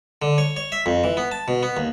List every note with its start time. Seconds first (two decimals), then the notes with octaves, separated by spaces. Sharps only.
0.22 D3
0.38 C#5
0.57 C#5
0.72 E5
0.86 F2
1.04 E3
1.17 B3
1.32 A5
1.48 B2
1.63 B3
1.77 D#2